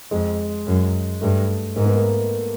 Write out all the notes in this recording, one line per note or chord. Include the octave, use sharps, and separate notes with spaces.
F2 G#3
F#2
G2 A3
G#2 A#3
B3
A#3